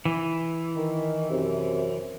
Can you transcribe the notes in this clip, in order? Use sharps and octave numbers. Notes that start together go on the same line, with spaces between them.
E3
D#3
F#2 C3